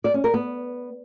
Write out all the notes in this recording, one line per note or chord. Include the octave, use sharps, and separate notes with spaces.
D5
C#4
A#4
B3